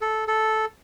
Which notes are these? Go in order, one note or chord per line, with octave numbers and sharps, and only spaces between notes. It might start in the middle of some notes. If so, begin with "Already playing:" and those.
A4
A4